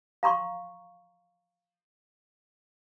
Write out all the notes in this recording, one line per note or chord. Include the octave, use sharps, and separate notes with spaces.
F5 A#5 C6 C#6